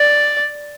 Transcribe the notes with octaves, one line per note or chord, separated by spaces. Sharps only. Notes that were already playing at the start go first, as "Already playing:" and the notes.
Already playing: D5